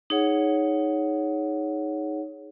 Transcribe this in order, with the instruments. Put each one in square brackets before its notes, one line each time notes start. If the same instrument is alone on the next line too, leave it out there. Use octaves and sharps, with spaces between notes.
[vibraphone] D#4 G#4 C#5 F#5